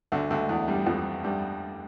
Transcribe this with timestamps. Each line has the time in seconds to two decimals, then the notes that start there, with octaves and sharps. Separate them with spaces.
0.12 D2 D3
0.30 D2 D3
0.49 E2 E3
0.68 G2 G3
0.86 F2 F3
1.24 G2 G3